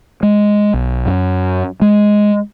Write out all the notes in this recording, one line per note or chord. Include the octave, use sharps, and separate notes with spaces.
G#3
B1
F#2
G#3